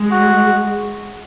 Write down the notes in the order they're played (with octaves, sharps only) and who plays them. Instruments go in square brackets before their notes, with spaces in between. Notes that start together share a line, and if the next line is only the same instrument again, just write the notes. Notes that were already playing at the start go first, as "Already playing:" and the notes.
Already playing: [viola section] G#3
[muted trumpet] F#4